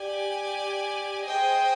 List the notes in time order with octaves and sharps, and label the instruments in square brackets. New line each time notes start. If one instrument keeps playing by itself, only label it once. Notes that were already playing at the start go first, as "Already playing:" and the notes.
Already playing: [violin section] G4 D5 G#5
[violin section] G#4 C5 D#5 G#5 [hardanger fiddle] G5